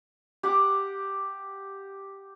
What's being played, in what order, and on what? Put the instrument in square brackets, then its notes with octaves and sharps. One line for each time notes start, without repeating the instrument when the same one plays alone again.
[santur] G4 F#5 D6